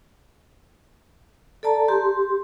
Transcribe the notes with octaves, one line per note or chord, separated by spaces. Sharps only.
A4 D5 A5 A#5
G4 C6